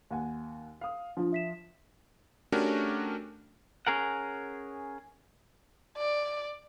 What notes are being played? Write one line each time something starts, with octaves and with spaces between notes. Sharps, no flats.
D#2 F#5 G#5
F5 D#6
F3 D4 F4
E5 B6 E7
A3 C#4 D4 F#4 G4 A#4
C#4 G#4 A#4 F#5
D5